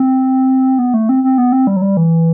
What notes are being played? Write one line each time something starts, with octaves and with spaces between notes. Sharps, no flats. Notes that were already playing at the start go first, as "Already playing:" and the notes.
Already playing: C4
B3
A3
C4
C4
B3
C4
G3
F#3
G3
E3